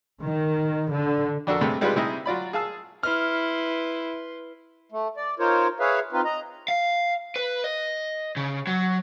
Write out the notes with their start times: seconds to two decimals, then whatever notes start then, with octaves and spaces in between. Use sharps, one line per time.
0.22 D#3
0.90 D3
1.47 F2 D4 F#4 A4 A#4
1.61 G2 C3 G#3 A3
1.81 G3 G#3 D4 F4 G4 B4
1.96 C3 G3 D#4 E4 G#4 D#5
2.26 F#3 F4 D5 B5
2.53 G#4 F5 A5 E6
3.03 E4 B4 C6 F6
4.92 A3
5.17 D5
5.39 D#4 F4 A#4 C5 C#5
5.80 G#4 B4 C#5 E5 F5
6.12 C4 D#4 F4 B4
6.25 D#5 A#5
6.68 F5
7.36 B4
7.64 D#5
8.37 C#3
8.67 F#3